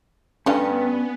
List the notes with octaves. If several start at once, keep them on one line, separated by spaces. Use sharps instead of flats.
G2 A3 B3 C#4 D4 F5 G#5